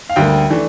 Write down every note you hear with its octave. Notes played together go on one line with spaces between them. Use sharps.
F5
D2 D3 G3 A#3 G5
E3 A3 D4